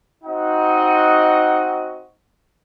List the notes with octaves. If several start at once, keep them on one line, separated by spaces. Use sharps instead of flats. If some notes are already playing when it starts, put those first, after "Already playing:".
C4 D#4 F#4 D#5 F#5